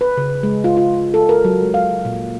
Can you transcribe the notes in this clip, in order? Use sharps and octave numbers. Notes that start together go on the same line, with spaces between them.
B4
C#3
G#3
F4
F4
A4
A#4
F#3
G#3
F5
A#2